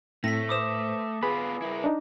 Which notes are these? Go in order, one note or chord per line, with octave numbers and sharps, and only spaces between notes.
A2 A3 C4 A#6 B6
B4 C5 D6 D#6 E7
B3 F4 G#4 B4 B5
E4 A#4
D4 D#4